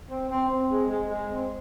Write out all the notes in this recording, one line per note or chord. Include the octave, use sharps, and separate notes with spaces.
C4
C4
C4
G#3
G#3
G#3
C4